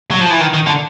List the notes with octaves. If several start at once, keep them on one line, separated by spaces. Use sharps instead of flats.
F#3
F3
E3
D#3
D#3
D3